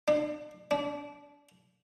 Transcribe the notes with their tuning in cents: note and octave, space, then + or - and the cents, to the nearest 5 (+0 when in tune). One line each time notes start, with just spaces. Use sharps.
D4 +40
D4 -25